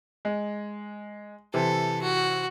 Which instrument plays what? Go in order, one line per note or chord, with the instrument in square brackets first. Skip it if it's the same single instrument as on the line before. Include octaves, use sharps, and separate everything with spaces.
[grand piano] G#3
[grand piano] C3 E3 [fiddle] A4
[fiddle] F#4